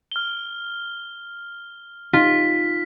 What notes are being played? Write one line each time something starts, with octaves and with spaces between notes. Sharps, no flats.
F6 G7
D#4 F4 B6